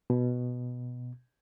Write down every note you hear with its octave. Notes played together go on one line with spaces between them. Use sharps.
B2